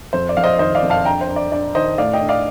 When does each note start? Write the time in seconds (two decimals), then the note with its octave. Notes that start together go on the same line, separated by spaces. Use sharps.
0.13 F2 C5
0.29 D5
0.37 F2 F5
0.44 C5 D#5
0.59 D#3 C5 D#5
0.75 D5 F5
0.82 F2
0.90 F5 A5
1.05 D4 G5 A#5
1.21 C5
1.29 D4
1.36 D5
1.52 D4 D5
1.75 D#3 C5 D#5
1.98 A2 D5 F5
2.13 D#5 G5
2.21 D4
2.29 D5 F5